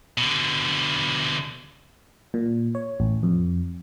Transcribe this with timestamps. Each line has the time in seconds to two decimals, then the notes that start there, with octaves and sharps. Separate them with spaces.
0.18 B2 D3
2.34 A#2
2.75 C#5
3.00 A1
3.23 F2